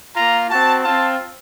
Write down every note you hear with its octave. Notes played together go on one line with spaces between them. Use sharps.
A#3 F4 A#5
C4 F#4 A5
C4 F4 A5